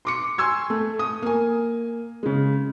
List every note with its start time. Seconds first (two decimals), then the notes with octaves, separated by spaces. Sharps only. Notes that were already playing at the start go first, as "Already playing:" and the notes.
0.05 C6 D6 C#7
0.38 G#5 C6 C#6 E6 G#6
0.70 A3
0.99 D#6
1.22 A#3 G#5
2.23 C#3 G#3